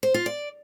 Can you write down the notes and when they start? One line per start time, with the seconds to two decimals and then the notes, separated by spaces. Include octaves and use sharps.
0.03 C5
0.14 F4
0.26 D5